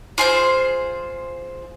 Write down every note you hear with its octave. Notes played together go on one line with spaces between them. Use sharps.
F4 G#4 C5